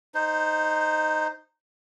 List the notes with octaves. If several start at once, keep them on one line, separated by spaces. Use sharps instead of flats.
D#4 C5